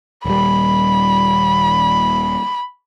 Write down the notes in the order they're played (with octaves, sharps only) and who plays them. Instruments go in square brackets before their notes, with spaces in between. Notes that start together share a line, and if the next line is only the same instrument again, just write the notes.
[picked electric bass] D#1 G3 [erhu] B5